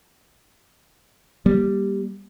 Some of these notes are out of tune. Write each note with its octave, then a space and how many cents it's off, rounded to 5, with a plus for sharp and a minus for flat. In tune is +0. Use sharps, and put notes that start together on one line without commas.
G3 +0 A#3 +20